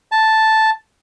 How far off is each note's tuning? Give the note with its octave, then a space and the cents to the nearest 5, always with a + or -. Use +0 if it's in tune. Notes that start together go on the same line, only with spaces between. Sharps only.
A5 +0